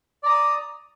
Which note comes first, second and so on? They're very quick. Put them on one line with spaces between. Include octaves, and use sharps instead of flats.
D5 A#5 D#6